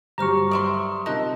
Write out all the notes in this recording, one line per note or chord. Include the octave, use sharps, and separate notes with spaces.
G2 F#3 G4 C5 A#5 C#6 F6
D5 E5 C6
D#6
C3 D#4 F4 A#4 A5 E6 F#6